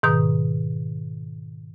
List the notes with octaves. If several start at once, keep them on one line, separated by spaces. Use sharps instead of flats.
G#2 B2 D#3 A#5 D#6